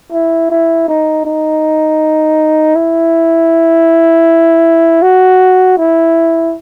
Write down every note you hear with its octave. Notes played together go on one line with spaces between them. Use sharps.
E4
E4
D#4
D#4
E4
F#4
E4